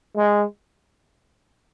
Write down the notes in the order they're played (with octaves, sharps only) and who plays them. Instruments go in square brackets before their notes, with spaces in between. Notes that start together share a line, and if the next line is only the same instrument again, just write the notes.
[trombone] G#3